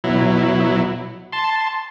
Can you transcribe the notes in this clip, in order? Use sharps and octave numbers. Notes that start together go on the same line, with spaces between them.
B2 F#3 E4
A5 C6